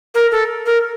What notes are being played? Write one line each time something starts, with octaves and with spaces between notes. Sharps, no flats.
A#4
A4
A#4